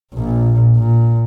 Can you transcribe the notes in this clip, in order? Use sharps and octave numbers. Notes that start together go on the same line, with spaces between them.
A#1 A#2
A#2